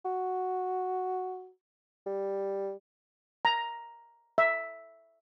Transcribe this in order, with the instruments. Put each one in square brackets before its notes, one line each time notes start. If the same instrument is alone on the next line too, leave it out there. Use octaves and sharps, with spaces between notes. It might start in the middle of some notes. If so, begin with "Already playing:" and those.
[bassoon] F#4
G3
[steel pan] A#5
E5